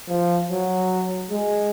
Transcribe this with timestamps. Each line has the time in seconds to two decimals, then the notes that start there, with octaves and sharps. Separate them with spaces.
0.09 F3
0.50 F#3
1.31 G#3